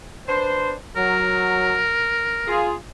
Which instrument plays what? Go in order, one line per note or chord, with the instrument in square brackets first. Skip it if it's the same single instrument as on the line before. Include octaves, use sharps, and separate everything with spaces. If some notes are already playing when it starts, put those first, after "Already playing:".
[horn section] D4 B4 C5
[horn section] F#3 [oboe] A#4
[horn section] F4 G#4